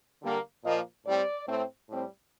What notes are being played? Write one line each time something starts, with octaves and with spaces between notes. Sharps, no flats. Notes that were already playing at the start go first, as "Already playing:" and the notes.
D3 G3 A#3
A#2 F3 A#3 D#5
A2 G3 C4 D5
A2 A3 C4
A2 G3 C4